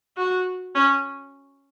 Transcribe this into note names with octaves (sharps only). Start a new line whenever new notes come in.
F#4
C#4